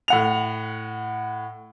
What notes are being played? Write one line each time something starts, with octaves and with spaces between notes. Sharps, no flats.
A2 F#5 F7